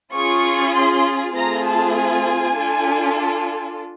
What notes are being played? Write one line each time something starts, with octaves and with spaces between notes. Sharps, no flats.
C#4 F4 G#4 C#6
C6
A3 C4 F4 G#4 A#5
A5
G#5
D4 F4 A4